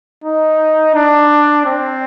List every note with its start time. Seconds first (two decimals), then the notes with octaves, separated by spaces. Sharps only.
0.24 D#4
0.94 D4
1.66 C4